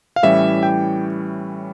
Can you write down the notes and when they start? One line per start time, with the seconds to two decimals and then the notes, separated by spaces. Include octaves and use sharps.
0.16 F5
0.23 A2 E3 G3 C#4 E5
0.63 G5